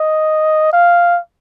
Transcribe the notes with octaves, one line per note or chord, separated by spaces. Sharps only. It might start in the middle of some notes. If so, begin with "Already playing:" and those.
Already playing: D#5
F5